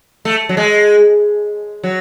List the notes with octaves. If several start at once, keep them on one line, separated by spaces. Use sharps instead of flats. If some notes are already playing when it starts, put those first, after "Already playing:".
A3
F#3
G#3
F#3